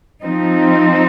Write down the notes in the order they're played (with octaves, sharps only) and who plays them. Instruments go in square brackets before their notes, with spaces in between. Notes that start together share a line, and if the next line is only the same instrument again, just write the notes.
[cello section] F3 C4 D#4